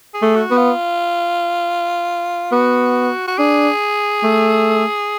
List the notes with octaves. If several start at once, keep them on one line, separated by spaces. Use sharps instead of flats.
G#4
A3
F#4
B3
F4
B3 F#4
F#4
D4 G#4
A3